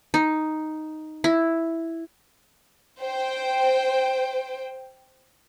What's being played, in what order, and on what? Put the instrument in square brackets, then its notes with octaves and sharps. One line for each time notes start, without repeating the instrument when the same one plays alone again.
[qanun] D#4
E4
[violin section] C5 G5